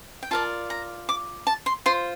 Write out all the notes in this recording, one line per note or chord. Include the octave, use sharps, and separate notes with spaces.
G5
F4 A#4 D5 A5
A#5
D6
A5
C6
F4 C5 C6